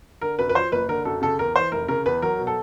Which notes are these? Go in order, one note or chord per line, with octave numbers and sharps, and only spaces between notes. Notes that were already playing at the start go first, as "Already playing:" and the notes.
D3 A#4
F#2 B4
B4
F3 C5
F#1 B4
D3 A#4
F#2 A4
C#3 A4
E2 A#4
E3 C5
F1 A#4
C#3 A#4
E2 B4
F#3 A#4
B2
A4